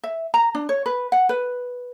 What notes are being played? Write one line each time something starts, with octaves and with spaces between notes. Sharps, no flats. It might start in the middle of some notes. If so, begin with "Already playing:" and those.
E5
A#5
D4
C#5
B4
F#5
B4